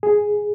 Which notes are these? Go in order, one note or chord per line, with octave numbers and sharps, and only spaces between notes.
G#4